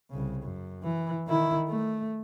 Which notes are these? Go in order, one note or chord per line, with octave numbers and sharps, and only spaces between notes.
C2 C#3
F#2
E3
D#3 E4
A3